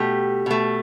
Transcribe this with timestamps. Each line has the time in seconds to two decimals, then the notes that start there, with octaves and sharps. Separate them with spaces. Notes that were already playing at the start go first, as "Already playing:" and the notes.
Already playing: B2 A3 G4
0.46 B2 A3